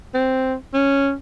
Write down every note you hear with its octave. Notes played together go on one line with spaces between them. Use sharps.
C4
C#4